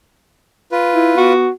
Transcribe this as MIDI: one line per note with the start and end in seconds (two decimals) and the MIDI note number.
0.72 1.33 65
0.72 1.33 71
0.95 1.16 64
1.17 1.48 59
1.17 1.50 66